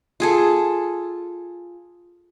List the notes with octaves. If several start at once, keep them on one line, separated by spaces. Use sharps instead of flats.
F4 G#4 A4